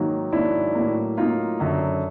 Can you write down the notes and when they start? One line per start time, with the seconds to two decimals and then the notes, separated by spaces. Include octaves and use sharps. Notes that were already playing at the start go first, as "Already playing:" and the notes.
Already playing: G#2 D#3 F#3 A#3
0.32 G#2 D#3 F#3 A#3 D4 E4
0.75 A2 F#3 A#3
1.17 A2 F#3 A#3 D#4 F4
1.60 F#2 D3 F#3